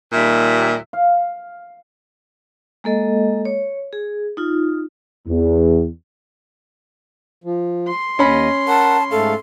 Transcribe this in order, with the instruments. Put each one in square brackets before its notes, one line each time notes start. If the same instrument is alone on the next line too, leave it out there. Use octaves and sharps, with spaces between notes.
[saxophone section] D#2 A#2 G3 E5
[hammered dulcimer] F5
[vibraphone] G#3 A#3 A4 D#5
C#5
G#4
D#4 F4
[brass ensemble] E2
[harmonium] F3
[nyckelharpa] C6
[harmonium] D#2 D#5 [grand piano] C#4 B5
[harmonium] A#4 F#5 [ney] A5
[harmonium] G#2 A3 F5 [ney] A4